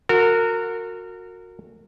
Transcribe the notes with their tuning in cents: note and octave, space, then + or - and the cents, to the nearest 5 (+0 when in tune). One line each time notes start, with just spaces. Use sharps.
F#4 -25 A#4 -25